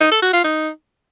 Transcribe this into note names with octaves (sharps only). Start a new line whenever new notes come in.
D#4
A4
F#4
F4
D#4